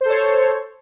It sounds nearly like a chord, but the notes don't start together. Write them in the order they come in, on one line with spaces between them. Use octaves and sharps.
C5 A4 C#5